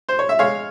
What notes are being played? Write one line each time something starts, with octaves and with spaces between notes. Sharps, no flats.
C5
C#5
E5
G#3 C#5 F5